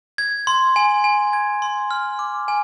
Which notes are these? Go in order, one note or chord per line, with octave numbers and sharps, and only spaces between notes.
G#6
C6
G#5
G#5
G#6
C6
F6
D6
G#5